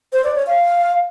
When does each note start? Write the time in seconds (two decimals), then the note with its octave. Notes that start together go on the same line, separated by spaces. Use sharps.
0.13 C5
0.24 D5
0.35 C#5
0.47 F5